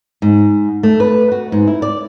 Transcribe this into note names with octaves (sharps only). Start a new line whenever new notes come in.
G#2
A3
B4
F#4
G#2
E4
D5